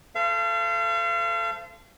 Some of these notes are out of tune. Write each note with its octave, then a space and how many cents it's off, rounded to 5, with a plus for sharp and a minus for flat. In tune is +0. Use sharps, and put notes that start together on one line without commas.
A4 +0 C5 -25 F5 -35